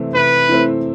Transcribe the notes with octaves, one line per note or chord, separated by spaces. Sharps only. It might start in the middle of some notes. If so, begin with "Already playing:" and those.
Already playing: C3 E3 A3 C4 E4
C3 B4
E3 A3 C4 E4